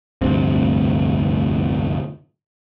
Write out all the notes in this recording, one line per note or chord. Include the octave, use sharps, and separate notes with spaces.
F1 D2 G2 C4